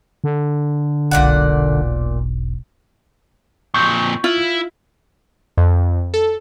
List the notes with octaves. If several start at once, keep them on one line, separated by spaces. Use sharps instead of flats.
D3
E1 B1 A#2 D5 F#5
F2 A#2 C#6 G6
E4 F4
F2
A4